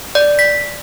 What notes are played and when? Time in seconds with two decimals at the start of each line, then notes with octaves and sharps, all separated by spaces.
0.15 D5
0.39 B6